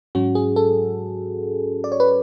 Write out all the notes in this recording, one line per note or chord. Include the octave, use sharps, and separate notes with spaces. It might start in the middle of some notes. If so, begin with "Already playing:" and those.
G#2 F#3 C#4 F#4
G#4
A4
D5
C#5
B4